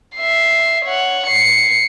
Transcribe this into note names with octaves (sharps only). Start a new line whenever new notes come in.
E5 C7
C#5 F#5
C7 C#7